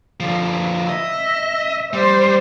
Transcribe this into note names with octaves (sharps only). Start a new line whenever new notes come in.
D3 F3
D#5 E5
G3 C5